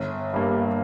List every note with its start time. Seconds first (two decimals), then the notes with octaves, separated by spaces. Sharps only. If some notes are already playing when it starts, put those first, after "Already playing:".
Already playing: G1
0.33 G2 G3 A#3